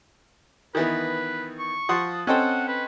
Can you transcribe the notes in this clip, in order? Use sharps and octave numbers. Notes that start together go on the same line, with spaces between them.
D#3 E3 B3 B4
C#6
F3 F#5 C6 D#6 A6
C4 C#4 A4 C5 D#5 F#5 G5
B4